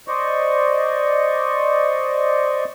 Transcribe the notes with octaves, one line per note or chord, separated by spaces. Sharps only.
C5 D5 D#5 C#6